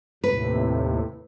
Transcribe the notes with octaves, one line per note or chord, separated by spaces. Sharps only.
D#2 A2 C3 B4